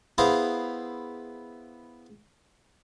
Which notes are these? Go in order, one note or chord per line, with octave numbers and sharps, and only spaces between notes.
B3 E4 G#4 C5 F5 A#5